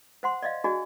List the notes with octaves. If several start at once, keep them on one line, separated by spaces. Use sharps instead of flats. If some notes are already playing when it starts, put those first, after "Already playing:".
C5 F#5 C6
D5 D#5 F5
D4 F#4 G#4 D5 D#5 G#5